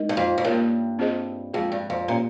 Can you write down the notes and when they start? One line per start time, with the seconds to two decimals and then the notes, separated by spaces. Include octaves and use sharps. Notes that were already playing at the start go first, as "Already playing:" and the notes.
Already playing: G#3 D#4 A#4 D#5
0.09 G2
0.17 F2
0.38 F2
0.45 G2 A#3 F4 A#4 C#5
0.99 C4 F4 G#4 C5 D#5
1.53 F2 F3 G#3 C4 F4 G#4
1.72 G2
1.90 F2
2.08 A#2 A#3 C#4 G4 C#5